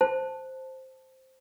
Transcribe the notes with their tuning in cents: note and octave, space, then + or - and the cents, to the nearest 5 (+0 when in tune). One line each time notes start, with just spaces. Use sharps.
C5 +0 A5 +0